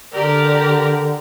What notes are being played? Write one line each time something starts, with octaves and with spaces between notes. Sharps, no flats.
D3 G4 A#4 D5